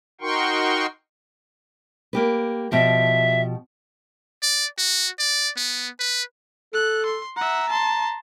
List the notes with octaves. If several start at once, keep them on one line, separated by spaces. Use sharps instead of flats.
D#4 F#4 A#4 G5 C6 C#6
A#3 G4 B4
B2 F3 G4 E5
D5
F#4
D5
B3
B4
A4 F#6
C6
E5 F#5 A#5
A5 C6